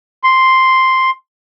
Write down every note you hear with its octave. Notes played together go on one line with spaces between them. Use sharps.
C6